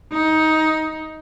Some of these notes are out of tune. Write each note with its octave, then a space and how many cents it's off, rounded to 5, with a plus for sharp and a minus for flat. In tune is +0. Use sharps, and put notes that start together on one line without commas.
D#4 +15